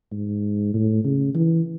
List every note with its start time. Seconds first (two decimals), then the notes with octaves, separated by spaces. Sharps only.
0.12 G#2
0.74 A2
1.05 C#3
1.35 E3